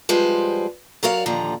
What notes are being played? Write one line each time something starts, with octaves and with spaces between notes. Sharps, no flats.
F3 G3 G#3 B4 C5
F#3 F#4 A#4 C#5 D5 F5
D#2 A#2 D3 F3 A#5